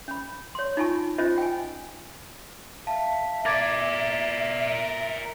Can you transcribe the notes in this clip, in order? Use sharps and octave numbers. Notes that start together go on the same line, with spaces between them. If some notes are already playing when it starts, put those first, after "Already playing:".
C#4 B5
C#5 C6
D#4 F4 G#5 A5 C#6
C#4 F4 C5 D#5
G5 G#5
E5 F5 A5
A#4 D5 D6 G#6 A6